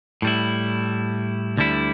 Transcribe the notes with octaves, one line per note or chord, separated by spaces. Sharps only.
A2 G3 E4
D2 D3 G3 E4